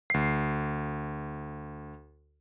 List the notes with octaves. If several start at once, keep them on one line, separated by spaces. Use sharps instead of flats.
D2 C7